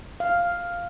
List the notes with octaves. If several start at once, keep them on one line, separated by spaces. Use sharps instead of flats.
F5